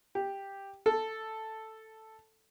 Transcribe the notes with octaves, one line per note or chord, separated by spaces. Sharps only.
G4
A4